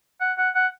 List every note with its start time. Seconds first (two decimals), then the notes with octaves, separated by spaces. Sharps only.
0.21 F#5
0.38 F#5
0.55 F#5